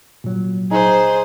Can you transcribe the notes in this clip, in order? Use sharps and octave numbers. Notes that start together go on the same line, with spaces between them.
A#2 F#3
D#4 G#4 C5